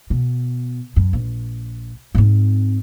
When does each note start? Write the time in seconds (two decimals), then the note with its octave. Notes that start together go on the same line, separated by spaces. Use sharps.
0.10 B2
0.96 F#2
1.13 A#1
2.15 G#2 C4